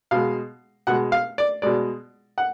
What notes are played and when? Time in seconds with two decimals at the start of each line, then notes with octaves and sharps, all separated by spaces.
0.11 B2 G#3 F5
0.87 B2 G#3 F#5
1.12 F5
1.38 D5
1.62 B2 G#3 D5
2.38 F#5